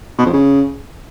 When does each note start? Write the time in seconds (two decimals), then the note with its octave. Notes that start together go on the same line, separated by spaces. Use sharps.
0.19 B2
0.26 F2
0.34 C#3